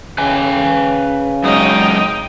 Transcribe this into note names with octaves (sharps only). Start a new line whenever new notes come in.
C#3 B4 G5 G#5
F#2 G#3 C#4 D#4 G5